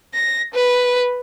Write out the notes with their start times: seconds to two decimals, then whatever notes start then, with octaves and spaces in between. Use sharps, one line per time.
0.14 A#6
0.54 B4